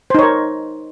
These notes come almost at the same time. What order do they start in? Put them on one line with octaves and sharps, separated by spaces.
C5 D#4 C#5 A#4